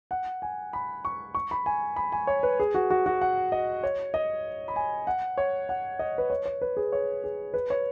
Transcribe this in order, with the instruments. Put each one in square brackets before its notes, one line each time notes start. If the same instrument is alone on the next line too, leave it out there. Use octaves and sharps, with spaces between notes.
[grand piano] F#5
G#5
B5
C#6
C#6
B5
G#5
B5
G#5
C#5
B4
G#4
F#4
F#4
F#4
F#5
D#5
C#5
D#5
B5
G#5
F#5
C#5
F#5
D#5
B4
C#5
C#5
B4
G#4
C#5
G#4
B4
C#5